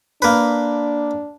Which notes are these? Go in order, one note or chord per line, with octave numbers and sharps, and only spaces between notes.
A#3 D4 B4